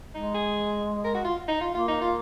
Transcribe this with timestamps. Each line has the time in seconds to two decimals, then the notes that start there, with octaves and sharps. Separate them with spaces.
0.14 G#3 D#4
0.34 G#4
1.05 A#4
1.15 F#4
1.25 F4
1.48 D#4
1.61 F4
1.74 A#3 F4
1.88 D#4
2.01 F4